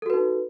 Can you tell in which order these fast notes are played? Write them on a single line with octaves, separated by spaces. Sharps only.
A4 F#4 B4 D#4